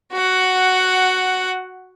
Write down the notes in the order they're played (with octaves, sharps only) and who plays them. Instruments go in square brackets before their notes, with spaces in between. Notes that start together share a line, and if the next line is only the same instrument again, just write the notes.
[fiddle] F#4 F#5